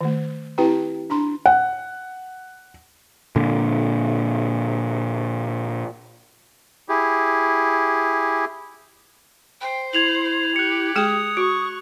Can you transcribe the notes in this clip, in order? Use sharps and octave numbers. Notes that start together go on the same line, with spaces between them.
D#3 A3
C4 E4 G4 B4 G5 A#5
D4 A#5 C6
F#5
A#2 D3
E4 G4 G#4
C5 G5
E4 G#6 F7 F#7
G4 F#6 C#7
G#3 G#4 G5 D#6
F#4 C#6